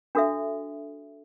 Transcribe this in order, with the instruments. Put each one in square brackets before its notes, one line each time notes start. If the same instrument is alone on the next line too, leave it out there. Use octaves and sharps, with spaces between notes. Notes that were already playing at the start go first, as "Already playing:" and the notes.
[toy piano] D4 F#4 A4 E5